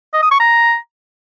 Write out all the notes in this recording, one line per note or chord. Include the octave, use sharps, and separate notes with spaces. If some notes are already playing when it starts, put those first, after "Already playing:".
D#5
D#6
C#6
A#5